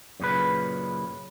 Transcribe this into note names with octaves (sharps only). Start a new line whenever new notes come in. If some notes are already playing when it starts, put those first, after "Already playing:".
F#2 A#2 C#3 B4